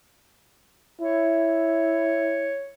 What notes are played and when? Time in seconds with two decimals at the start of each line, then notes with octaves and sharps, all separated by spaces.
1.01 E4 C#5